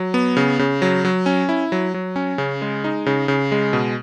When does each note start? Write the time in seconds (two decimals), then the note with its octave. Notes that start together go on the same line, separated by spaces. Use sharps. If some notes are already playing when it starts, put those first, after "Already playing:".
Already playing: F#3
0.14 B3
0.37 C#3
0.59 C#3
0.82 F#3
1.05 F#3
1.26 C#4
1.49 E4
1.72 F#3
1.94 F#3
2.16 C#4
2.38 C#3
2.62 G#3
2.84 D#4
3.06 C#3
3.28 C#3
3.52 G#3
3.73 B2